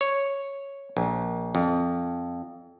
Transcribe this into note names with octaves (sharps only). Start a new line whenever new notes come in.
C#5
A#1
F2